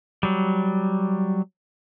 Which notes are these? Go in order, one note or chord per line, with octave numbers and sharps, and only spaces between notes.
F#3 G3